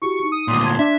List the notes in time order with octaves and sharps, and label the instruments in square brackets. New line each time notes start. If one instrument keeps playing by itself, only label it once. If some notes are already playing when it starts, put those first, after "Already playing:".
[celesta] E4 F#4 G4 [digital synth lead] C#6
[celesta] D#4 C#7
[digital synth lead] D#6
[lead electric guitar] D2 A#2 [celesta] C6 D6
[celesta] A5 C6 G#6
[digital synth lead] D4 [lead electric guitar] E5